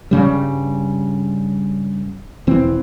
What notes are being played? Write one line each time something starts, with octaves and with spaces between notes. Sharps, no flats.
G2 C#3 G3
E1 E3 C4